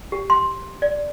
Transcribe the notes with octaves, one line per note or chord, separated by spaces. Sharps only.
G4
C6
D5